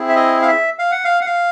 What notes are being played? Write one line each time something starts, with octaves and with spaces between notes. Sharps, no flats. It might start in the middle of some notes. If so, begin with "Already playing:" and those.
Already playing: C4 E4 G#4
E5
D#5
F5
E5
F5
F#5
F5
F#5
F5